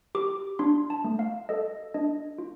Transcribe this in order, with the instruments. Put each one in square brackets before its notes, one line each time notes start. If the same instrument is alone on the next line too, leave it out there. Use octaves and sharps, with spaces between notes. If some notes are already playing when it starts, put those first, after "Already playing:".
[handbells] G4 D6
D4 C6
A5
A3
F5
A4 D#5
D4 D#5
F4